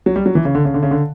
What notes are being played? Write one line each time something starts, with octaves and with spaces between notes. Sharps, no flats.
F#3
G3
F#3
E3
C#3
D3
C#3
D3
C#3
D3